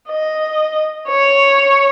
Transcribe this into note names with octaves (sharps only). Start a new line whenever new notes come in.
D#5
C#5